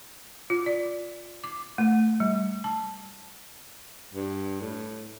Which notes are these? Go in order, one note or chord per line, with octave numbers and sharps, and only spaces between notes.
F4
D5
D6
A3
G3
A5
G2
A2